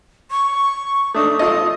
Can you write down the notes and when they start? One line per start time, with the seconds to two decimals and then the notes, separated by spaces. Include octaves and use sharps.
0.31 C#6
1.14 A3 D4 D#4 D#6
1.39 F4 A4 D#5